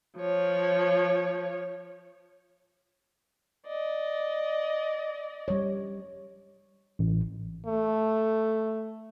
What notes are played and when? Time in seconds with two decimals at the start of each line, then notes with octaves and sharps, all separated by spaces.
0.17 F3 C#5
3.66 D5 D#5
5.48 G3 C#5
6.99 A1
7.66 A3